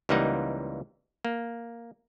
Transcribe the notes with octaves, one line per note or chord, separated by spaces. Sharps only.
C#2 E3 G3 A#3 D#4 F#5
A#3